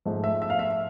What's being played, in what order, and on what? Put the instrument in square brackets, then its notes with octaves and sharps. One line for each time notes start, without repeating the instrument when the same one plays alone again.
[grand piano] G#2 F3 A3
E5
E5
F5
E5